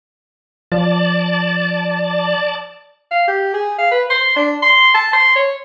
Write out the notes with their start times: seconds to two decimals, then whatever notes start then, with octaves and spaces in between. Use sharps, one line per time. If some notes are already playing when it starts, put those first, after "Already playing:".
0.72 F3 D5 A5
3.11 F5
3.28 G4
3.54 G#4
3.79 F5
3.92 B4
4.10 C6
4.36 D4
4.62 C6
4.94 A5
5.13 C6
5.35 C#5